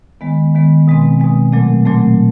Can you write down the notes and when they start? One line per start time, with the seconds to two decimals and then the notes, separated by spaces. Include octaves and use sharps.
0.21 D#3 G#3 B3
0.55 D#3 G#3 B3
0.88 B2 G#3 C4
1.20 B2 G#3 C4
1.52 A#2 F#3 A3 C4
1.86 A#2 F#3 A3 C4